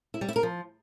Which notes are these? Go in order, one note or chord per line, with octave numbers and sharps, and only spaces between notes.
E4
G3
E4
A#4
F3